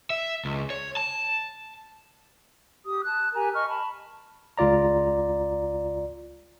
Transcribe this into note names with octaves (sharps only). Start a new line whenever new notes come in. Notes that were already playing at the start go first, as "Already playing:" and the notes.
E5
C#2
C#5
A5
G4 D#6
A5 F#6
G4 A#4 G#5 A#5
D#5 C#6 F6
A5 B5
C#2 F4 D5 A#5